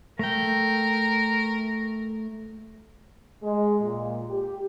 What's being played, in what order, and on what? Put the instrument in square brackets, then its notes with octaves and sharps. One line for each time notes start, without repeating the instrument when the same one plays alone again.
[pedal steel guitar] A3 G5 [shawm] A#4
[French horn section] G#3
A#2
G4